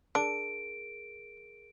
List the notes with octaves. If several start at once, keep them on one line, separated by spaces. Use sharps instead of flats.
D4 G#4 A#4 D7